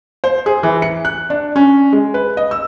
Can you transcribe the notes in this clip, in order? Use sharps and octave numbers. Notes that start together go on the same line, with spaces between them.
C5
G#4
E3
C#7
F#6
D4
C#4
G#3
B4
D#5
E6